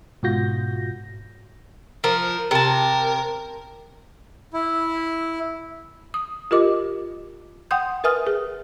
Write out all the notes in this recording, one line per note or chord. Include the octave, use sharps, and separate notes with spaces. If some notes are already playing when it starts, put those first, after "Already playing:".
G#2 B2 F4 F#4 G6 A#6
F3 A#4
C3 A#4 A5
E4
D#6
F4 G4 A#4 D#5 D6
F#5 G5 C6 D#6 G6
A#4 B4 E5 G#5 D#6 F6
G#4